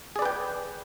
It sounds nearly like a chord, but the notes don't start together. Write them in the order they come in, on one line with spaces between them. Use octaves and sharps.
G#4 D5 B4 G5